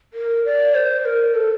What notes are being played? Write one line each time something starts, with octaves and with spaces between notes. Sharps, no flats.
A#4
D5
C5
A#4
A4